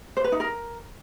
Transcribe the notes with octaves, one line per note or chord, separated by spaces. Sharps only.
C5
B4
D#4
A#4